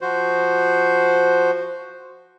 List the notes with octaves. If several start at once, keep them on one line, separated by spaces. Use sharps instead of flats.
F3 F#4 C5